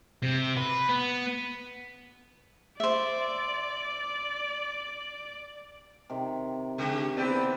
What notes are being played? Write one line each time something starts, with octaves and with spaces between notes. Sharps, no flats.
C3
B4
B3
C5 D5 E5
C3 D#3
C#3 G#3 G4
E2 C4 G4 B4 D5